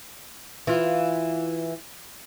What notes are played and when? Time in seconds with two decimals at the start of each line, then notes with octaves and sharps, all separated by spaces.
0.67 E3 F4